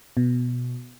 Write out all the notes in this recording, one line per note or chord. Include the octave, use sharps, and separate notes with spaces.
B2